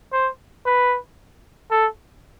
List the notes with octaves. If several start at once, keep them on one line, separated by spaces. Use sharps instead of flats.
C5
B4
A4